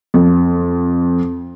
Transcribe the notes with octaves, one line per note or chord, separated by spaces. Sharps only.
F2